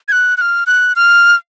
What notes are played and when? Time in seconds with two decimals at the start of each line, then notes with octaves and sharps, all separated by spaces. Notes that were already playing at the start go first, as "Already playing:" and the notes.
0.08 G#6
0.12 F#6
0.37 F#6
0.41 F6
0.67 F#6
0.96 F6